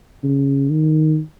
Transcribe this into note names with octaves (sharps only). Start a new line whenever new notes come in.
C#3
D#3